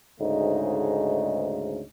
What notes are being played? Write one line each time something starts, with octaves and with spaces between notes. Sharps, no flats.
D2 G#2 C#3 A3 D#4